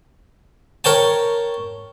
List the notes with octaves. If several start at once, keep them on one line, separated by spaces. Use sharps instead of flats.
A#4 C#5 G5 A5